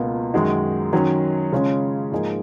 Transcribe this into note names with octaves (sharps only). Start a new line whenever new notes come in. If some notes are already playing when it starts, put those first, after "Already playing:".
Already playing: C#2 B2 A#3 F4
F#2 D#3 G#3 D#4 F#4
D#3 F#3 C#4
C#3 G#3 C#4 F4
G#2 F3 A#3 D#4 G#4